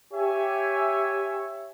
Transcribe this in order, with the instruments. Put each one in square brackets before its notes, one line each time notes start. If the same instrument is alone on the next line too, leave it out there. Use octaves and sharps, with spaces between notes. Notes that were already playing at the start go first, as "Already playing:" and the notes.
[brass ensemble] G4 C#5 E5 G#5